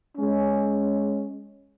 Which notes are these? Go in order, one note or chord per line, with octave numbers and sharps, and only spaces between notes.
G#3 C#4